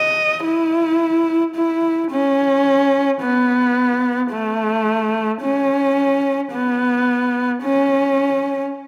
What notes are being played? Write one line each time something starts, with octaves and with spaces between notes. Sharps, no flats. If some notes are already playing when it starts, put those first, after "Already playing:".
Already playing: D#5
E4
E4
C#4
B3
A3
C#4
B3
C#4